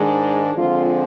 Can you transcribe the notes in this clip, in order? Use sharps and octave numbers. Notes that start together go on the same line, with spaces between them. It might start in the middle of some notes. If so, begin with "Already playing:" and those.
Already playing: G#2 D#3 G#3 D4
D3 F3 G#3 C4 F4